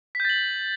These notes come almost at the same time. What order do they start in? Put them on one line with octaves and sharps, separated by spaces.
B6 G6 A6 F#7